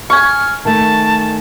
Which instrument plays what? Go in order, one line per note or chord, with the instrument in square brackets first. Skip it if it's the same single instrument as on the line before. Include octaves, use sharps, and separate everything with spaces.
[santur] G#5 C#6 [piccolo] F6
[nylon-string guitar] D#3 A3 [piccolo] A5